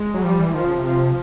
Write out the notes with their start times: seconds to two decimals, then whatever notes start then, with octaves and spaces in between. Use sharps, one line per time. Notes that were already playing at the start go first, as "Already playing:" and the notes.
Already playing: G#3
0.14 F#3
0.24 F3 G3
0.39 E3
0.54 D#3 F3
0.65 C#3
0.75 C3
0.86 F3